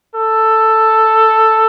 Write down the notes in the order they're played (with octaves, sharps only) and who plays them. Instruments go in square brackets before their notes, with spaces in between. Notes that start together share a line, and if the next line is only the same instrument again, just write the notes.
[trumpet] A4